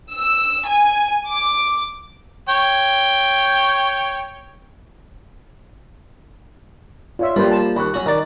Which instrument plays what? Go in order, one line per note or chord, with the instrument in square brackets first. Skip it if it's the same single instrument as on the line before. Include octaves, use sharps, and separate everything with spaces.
[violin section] E6
G#5
D6
[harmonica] C#5 G5
[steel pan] F4 E5 [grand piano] C#5 D5
[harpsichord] F3 [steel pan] G3 B4 C5 [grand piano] A#3
[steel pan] A5
[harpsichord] D#2 [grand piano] B5 C#6 F#6
[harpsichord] F#3 C#4 F#4
[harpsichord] D#3 D5 [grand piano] A#5